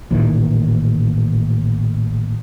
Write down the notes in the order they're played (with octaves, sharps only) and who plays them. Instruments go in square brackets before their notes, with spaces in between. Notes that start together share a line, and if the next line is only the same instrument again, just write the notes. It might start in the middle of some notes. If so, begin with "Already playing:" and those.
[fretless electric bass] A1 A#2 D#3 E3